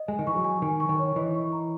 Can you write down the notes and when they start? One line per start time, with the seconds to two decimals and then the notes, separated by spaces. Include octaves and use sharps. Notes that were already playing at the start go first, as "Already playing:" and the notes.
Already playing: D#5
0.08 G#3 G#5
0.19 D#3
0.27 E3 C#6
0.36 F#3
0.44 G#5
0.62 D#3 G#5
0.80 C#6
0.89 D#3
0.99 C#5
1.16 E3 D#5
1.35 C#6
1.52 A#5